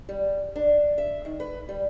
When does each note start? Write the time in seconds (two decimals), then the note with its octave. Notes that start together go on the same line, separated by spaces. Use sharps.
0.09 G3
0.56 D4
0.98 E5
1.25 D#3
1.40 B4
1.69 G3